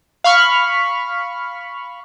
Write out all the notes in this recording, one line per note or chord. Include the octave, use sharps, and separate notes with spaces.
F5 B5 C#6 F6